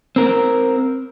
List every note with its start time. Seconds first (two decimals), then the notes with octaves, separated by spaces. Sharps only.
0.16 C4 A#4